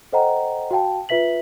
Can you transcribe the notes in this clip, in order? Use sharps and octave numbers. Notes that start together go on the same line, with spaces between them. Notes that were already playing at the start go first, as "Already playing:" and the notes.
A4 C5 D#5 F#5 G5 A#5
F#4 F5 G5 A5
F4 B4 E5 B6 F#7